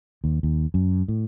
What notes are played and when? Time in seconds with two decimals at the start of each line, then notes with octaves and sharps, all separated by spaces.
0.24 D#2
0.43 D#2
0.74 F#2
1.08 A2